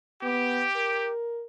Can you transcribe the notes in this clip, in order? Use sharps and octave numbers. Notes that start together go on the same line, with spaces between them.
B3 G4
A#4